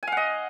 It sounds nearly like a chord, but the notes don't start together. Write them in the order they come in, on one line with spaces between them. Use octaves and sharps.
G#5 F5 F#5 D#5